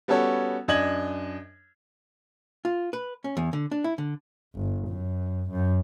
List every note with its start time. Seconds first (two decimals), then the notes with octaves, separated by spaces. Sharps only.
0.08 G3 B3 C#4 F#4 A4 C#5
0.68 F#2 D4 D#5 G#6 F#7
2.65 F4
2.93 B4
3.24 C#4
3.37 E2
3.53 D3
3.71 D4
3.84 E4
3.98 D3
4.55 G1
4.88 F#2
5.50 F#2